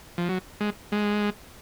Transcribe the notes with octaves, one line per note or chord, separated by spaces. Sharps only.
F3
F#3
G#3
G#3